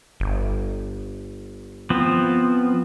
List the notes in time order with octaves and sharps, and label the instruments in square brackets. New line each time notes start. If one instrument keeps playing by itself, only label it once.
[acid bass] G1
[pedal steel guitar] F3 B3 C4